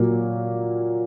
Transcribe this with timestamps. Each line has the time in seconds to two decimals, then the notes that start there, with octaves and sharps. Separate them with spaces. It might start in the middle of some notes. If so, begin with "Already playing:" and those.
Already playing: A#2 F#3 A#3